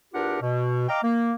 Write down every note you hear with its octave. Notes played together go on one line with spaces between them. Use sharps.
E2 D4 F4 G4 A#4 F#5
B2
D#5 F5 G5 A#5 D6
A#3